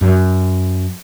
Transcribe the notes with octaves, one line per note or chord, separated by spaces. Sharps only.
F#2